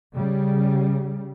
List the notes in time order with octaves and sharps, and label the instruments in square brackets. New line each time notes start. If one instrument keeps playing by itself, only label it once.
[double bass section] C#3 G3